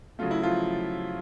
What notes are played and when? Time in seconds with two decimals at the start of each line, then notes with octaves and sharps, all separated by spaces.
0.19 C#3 F#3 A3 F4
0.31 E4
0.43 F3 F4